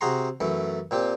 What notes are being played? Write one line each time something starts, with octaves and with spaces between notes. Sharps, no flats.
C3 F#4 G#4 A#5 C6
F#2 E3 A3
A#2 C4 G4